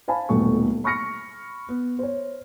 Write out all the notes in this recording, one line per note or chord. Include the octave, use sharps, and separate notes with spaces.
C5 F5 G#5 A5 B5
D#1 B1 A3 B3 C#6
B5 C#6 F6 A#6 C#7
B3
C5 C#5